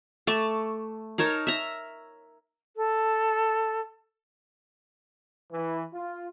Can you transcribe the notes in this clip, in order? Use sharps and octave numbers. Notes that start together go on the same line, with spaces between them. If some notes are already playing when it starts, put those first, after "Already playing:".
A3 A5 C#6 D6
D#4 A#4 C#5 A5
E5 A#5
A4
E3
F4